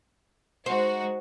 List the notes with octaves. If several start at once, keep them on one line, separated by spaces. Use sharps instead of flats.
G#3 D#4 F#4 C5